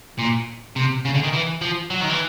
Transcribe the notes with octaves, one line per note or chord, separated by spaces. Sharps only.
A#2
C3
C#3
D3
D#3
E3
F3
F#3
D#3
E3